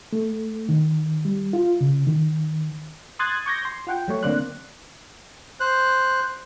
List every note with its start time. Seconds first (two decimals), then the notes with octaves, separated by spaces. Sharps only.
0.13 A3
0.69 D#3
1.25 G3
1.53 F4
1.81 C#3
2.07 D#3
3.19 C6 D#6 F#6 G#6 A6
3.46 C#6 D6 G6 G#6 A#6
3.65 C6
3.87 F4 F#5 G5
4.08 F#3 A3 C#5
4.23 D3 A#3 C4 D5 C6 F#6
5.60 C5 F#6